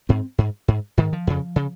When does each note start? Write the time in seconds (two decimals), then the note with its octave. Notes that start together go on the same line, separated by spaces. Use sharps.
0.09 G#2 C4
0.38 G#2
0.68 G#2
0.97 G#2 D#3
1.13 F3
1.27 F2 C#3
1.56 C#3